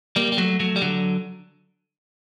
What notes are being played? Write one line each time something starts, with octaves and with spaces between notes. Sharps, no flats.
G3 A#3
G3
F#3 A3
F#3 A3
G3
D3 F#3